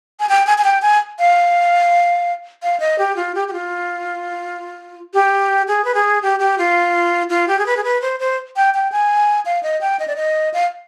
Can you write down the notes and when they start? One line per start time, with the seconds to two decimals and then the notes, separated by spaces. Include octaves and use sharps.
0.20 G#5
0.29 G5
0.47 G#5
0.58 G#5
0.64 G5
0.82 G#5
1.19 F5
2.62 F5
2.80 D#5
2.99 G4
3.16 F4
3.35 G4
3.48 G4
3.53 F4
5.14 G4
5.68 G#4
5.85 B4
5.94 G#4
6.23 G4
6.39 G4
6.58 F4
7.30 F4
7.48 G4
7.59 G#4
7.66 B4
7.77 G#4
7.84 B4
8.02 C5
8.20 C5
8.56 G5
8.74 G5
8.92 G#5
9.46 F5
9.63 D#5
9.81 G5
9.99 D#5
10.08 D5
10.16 D#5
10.54 F5